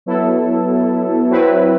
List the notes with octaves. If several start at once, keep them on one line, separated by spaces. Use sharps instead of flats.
F#3 B3 E4 A4
F#3 C4 E4 B4